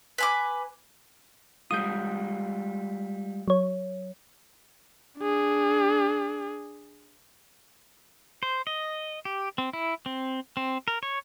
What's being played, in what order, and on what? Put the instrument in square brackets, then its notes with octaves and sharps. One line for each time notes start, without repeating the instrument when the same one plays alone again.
[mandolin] B4 G#5 D6
[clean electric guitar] G3 G#3 F4 [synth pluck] D#6 G6
[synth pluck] F#3 C#5
[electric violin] D4 G#4
[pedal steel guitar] C5
D#5
G4
C4
E4
C4
C4
A#4
C#5